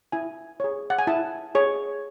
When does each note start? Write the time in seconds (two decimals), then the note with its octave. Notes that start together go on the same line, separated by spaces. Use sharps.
0.12 E4 G#5
0.60 G#4 C#5
0.90 F#5
0.99 G#5
1.07 E4 A5
1.55 G#4 C#5